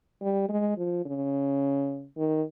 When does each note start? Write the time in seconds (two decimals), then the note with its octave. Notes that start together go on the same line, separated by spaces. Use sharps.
0.21 G3
0.49 G#3
0.77 F3
1.05 C#3
2.17 D#3